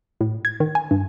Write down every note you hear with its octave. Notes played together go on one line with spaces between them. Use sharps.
A2
G#6
D#3
G#5
G2